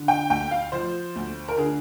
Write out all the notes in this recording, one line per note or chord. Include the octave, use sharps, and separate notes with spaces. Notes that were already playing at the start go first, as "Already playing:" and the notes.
Already playing: D3
G5
D2 G5
F5
F3 C5
D2
A#4
D3 G#4